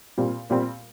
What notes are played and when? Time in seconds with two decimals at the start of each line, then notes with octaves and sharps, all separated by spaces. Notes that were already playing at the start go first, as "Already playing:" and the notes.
0.18 A#2 G3 C4
0.50 A#2 G3 C4